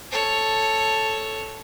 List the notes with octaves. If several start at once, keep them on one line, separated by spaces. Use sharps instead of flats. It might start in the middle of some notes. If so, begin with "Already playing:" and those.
A4 C#5